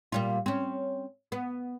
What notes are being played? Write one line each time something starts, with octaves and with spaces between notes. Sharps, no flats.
A#2 G3 F4
C4 C#4
B3